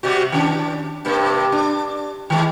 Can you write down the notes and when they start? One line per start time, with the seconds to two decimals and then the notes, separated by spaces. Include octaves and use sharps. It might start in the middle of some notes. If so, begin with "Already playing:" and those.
0.03 C3 G3 F#4
0.32 D#3 C#4 D4
1.05 G2 C3 A#3
1.52 D4
2.30 D#3 G#3 E4